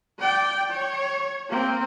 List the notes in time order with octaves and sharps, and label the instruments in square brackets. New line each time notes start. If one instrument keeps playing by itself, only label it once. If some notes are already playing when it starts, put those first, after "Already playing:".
[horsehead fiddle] D5 G5
C#5
A#3 C4